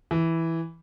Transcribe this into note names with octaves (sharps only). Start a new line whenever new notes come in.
E3